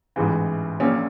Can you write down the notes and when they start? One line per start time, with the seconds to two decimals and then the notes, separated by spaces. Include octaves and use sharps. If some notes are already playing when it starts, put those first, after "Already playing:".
0.16 A1 G#2 E3
0.80 A#1 A#2 C#4